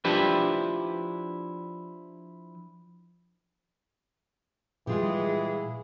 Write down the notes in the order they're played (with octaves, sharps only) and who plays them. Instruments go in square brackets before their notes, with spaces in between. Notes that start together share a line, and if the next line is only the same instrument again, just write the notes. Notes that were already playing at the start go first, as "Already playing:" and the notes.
[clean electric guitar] F3 D4 E4 G4 B4
[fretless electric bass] A#2 F3 G3 [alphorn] E3 [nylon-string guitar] G#3 F4 G4 [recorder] G#4